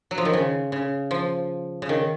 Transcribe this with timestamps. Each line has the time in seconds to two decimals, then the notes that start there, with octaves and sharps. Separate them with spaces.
0.11 F#3
0.18 F3
0.25 D#3
0.33 C#3
0.72 C#3
1.11 F3
1.82 C#3
1.89 D#3